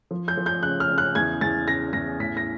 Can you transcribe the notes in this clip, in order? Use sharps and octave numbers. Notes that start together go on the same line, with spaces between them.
F3
G6
F3
G6
C#3 F#6
F6
C#3
F#6
E2 G#6
E2 A6
C#3 A#6
E2 A#6
A1 B6
A#6